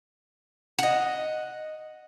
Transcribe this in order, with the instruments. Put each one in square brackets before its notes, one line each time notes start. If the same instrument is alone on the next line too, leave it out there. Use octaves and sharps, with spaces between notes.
[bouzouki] D#5 F#5